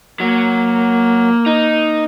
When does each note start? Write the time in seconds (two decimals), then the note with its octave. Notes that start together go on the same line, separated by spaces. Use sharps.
0.20 F#3 A#3
1.46 D#4